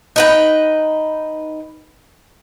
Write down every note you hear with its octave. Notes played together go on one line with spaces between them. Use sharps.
D#4 B4 G5